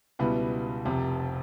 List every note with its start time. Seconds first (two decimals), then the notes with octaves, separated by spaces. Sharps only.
0.19 C#2 B2 G3 B3 E4
0.85 F1 F2 C3